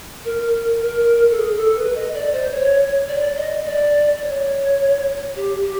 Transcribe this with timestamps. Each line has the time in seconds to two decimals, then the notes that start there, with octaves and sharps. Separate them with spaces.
0.25 A#4
0.82 A#4
1.30 A4
1.37 G#4
1.56 A4
1.76 B4
1.95 D#5
2.14 D5
2.32 C5
2.52 C#5
3.08 D5
3.37 D#5
3.65 D5
4.22 C#5
5.35 G4
5.63 G4